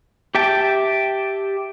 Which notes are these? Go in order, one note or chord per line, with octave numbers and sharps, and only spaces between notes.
G4 E5 G5 A5